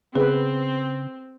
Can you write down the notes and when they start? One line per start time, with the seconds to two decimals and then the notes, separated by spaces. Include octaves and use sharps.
0.15 C#3 B3 C4 G#4 B4